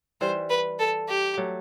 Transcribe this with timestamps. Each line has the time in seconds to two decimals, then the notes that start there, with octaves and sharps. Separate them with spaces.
0.21 E3 G3 C5
0.50 B4
0.80 A4
1.08 G4
1.37 F#3 A3